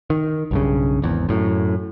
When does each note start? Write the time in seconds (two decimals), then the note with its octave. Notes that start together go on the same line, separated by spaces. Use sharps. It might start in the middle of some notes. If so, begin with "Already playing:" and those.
0.10 D#3
0.51 B1 G2 C#3
1.02 G#1 E2
1.29 F#2 A2